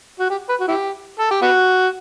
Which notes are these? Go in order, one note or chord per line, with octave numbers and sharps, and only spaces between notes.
F#4
G4
B4
F#4
E4 G4
A4
G4
B3 F#4